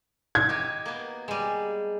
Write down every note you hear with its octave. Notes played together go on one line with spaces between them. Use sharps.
G#6
D#4 G4
A#3 B3
G3 G#3